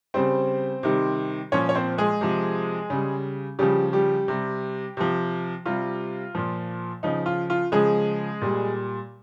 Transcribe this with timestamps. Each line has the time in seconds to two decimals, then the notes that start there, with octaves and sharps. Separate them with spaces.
0.14 C#3 G3 C4 C5
0.83 C3 D#3 G3
1.52 A#2 F3 C#4 C#5
1.69 C#5
1.75 C4 C5
1.98 G#3 G#4
2.21 C3 F3
2.90 C#3 G3
3.59 C#3 F3 G3 G4
3.93 G3 G4
4.28 C3 G3
4.97 C3 F3
5.66 C3 G3 F4
6.35 A#2 F3
7.03 C#3 F3 D#4
7.26 F4
7.50 F4
7.72 C#3 F3 G#3 G#4
8.41 A#2 G3